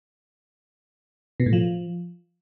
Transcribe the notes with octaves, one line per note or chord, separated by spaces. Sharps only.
B2
A2
F3